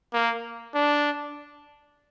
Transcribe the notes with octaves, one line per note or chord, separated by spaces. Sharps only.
A#3
D4